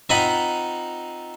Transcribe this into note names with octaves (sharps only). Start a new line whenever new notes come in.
C4 D#4 F4 D#5 F#5 B5